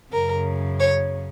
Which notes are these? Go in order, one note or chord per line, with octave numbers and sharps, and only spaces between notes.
F#2 C#3 A#4
C#5